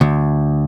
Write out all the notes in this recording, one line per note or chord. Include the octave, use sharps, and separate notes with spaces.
D2